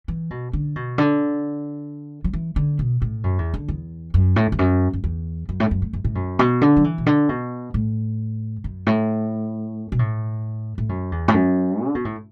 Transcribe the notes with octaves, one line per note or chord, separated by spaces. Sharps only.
E3
B2
D3
B2
D3
F#3
E3
D3
B2
A2
F#2
E2
D3
E2
F#2
A2
E2
F#2
F#2
E2
F#2
A2
F#2
A2
F#2
A2
F#2
B2
D3
F#3
E3
B2
D3
B2
A2
F#2
A2
B2
A2
A2
F#2
E2
A2
F#2
D3
B2
A2